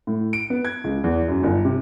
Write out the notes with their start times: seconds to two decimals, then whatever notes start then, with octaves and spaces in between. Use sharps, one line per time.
0.07 A2
0.33 D7
0.50 B3
0.65 G#6
0.84 C#2
1.04 E2
1.28 F#2
1.43 G1
1.65 C3